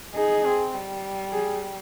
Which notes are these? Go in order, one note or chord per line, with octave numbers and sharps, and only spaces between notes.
D#4 G#4
C4
G3
G#4